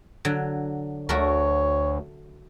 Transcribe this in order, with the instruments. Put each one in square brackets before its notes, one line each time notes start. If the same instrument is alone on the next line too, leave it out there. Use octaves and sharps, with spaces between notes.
[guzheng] D3 F#3
[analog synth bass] D2 [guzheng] A3 F#4 A#4 [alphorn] C#5